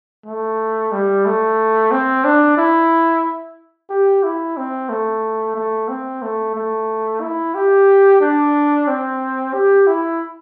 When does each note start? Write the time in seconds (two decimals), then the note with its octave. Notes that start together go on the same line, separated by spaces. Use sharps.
0.26 A3
0.92 G3
1.26 A3
1.91 C4
2.25 D4
2.57 E4
3.90 G4
4.23 E4
4.57 C4
4.89 A3
5.55 A3
5.89 C4
6.22 A3
6.55 A3
7.21 E4
7.54 G4
8.21 D4
8.88 C4
9.53 G4
9.87 E4